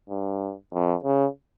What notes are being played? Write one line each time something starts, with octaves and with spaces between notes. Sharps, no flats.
G2
F2
C#3